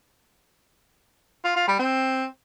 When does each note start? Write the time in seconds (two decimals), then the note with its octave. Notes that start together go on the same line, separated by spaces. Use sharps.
1.45 F4
1.56 F4
1.68 G3
1.79 C4